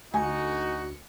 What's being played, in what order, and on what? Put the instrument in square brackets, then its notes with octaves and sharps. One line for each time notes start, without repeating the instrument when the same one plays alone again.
[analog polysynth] D2 C#7 [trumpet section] D#4 F#4 [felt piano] G#5